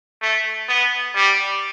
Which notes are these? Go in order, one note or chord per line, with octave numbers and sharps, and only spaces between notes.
A3
B3
G3